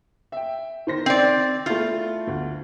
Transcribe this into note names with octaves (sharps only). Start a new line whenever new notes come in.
E5 G5
D#3 C5 A#6
C4 D5
A3 E4 F4
D2